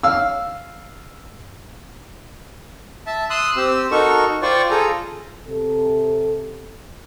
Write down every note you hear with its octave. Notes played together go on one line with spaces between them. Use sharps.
F5 E6
E5 A5
C6 D#6 E6 F#6
C4 G4 E6
D#4 F#4 A4 A#4 C#6
F4 C5 D5 G5 C#6
F4 G#4 A4 A#5
C3 A4